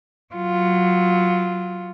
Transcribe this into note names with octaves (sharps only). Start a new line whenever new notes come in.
F#3 F4